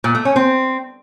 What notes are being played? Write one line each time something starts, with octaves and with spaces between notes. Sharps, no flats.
A#2
A3
C#4
C4